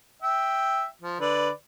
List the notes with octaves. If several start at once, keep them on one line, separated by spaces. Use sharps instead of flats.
E5 G5
F3
D3 B4 D5